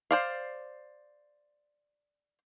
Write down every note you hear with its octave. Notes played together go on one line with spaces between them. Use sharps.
C5 D5 F5